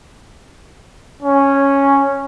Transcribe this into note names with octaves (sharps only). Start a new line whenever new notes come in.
C#4